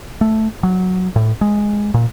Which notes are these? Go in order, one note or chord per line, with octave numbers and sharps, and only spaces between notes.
A3
F#3
A2
G#3
A#2